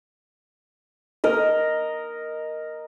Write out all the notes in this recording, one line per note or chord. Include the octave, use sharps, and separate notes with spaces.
A#4 D#5